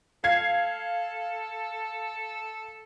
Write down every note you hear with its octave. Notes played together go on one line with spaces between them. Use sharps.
A4 F5 G#6 C7